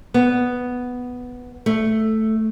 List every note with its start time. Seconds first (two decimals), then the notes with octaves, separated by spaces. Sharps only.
0.14 B3
1.66 A3